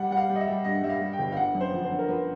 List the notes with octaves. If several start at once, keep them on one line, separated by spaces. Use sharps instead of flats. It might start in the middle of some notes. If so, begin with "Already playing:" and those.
Already playing: G3 F#5
G3 F#5
F5
G3
D#5
E5
G3
G2 D#5
G3 E5
F5
G3
G5
G1
F5
D3 F#5
F#2
C5
F3
C5
D3
A#4
F3 B4